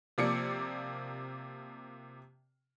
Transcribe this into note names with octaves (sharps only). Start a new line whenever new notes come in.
C3 F3 A#3 D5 D6 C#7